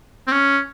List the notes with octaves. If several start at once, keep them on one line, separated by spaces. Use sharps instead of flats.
C4
C#4